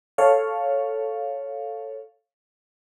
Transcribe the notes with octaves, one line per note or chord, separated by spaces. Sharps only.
A4 C#5 F5